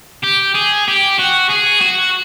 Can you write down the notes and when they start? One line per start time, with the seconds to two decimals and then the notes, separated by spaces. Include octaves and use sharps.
0.24 G4
0.55 G#4
0.88 G4
1.18 F#4
1.49 G#4
1.81 F#4